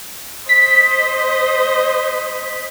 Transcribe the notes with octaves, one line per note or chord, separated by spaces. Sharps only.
C5 D#5 B6